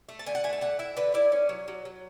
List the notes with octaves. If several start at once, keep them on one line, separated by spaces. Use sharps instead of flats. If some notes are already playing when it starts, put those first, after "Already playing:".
A3
A5
D3 G#5
F#5
A3 G#5
A5
D3 F#5
E4 E5
D3 B4
E4 D5
C#4
F#3
F#3
F#3